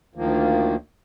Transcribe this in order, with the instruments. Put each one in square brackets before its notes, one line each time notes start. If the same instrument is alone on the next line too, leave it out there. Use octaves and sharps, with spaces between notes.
[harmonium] D2 D#3 F3 A#3